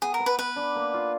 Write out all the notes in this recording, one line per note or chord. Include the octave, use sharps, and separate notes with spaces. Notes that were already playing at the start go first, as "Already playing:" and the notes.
B3 G#4
A#4
B3
B4
B3 B4
D4
A#3
F4